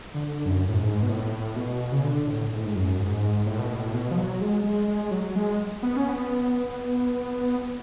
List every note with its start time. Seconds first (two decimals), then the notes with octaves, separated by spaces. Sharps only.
0.14 D3
0.45 F#2
0.69 A2
0.77 G#2
1.03 B2
1.09 A2
1.56 B2
1.92 C#3
2.04 D3
2.27 A2
2.51 G#2
2.59 A2
2.66 G#2
2.75 F#2
2.99 G#2
3.46 A2
3.59 B2
3.73 A2
3.94 B2
4.11 F3
4.17 F#3
4.41 G#3
4.64 G#3
4.88 G#3
5.11 F#3
5.36 G#3
5.83 B3
5.96 C#4
6.09 B3